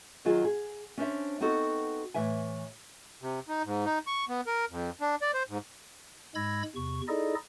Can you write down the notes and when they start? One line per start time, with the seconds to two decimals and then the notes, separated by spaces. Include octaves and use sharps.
0.25 D#3 F#3 F4 G#4
0.45 G#4
0.98 C#4 D4 C5 E5
1.40 B3 C4 D#4 F#4 A4
2.14 A2 E3 E5 G#5
3.22 C3
3.49 D#4
3.65 G#2
3.85 D#4
4.07 C#6
4.29 B3
4.47 A#4
4.70 F2
5.01 D4
5.22 D5
5.34 C5
5.49 G#2
6.35 G#2 G#3 B5 E6 G#6 A#6
6.76 E2 C3 C#6
7.08 D#4 E4 G#4 A4 D5 D#5